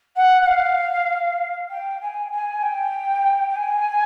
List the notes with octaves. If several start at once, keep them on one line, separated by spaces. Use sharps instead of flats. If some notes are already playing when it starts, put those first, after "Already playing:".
F#5
F#5
F5
G5
G#5
G#5
G5
G5
G#5